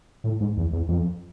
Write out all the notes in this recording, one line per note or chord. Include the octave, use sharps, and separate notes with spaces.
A2
G#2
E2
E2
F2